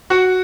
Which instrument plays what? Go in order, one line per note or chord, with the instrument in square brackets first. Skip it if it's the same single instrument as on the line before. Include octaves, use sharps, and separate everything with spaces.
[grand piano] F#4